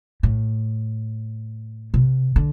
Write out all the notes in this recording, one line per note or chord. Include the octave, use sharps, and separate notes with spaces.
A2
C3
D3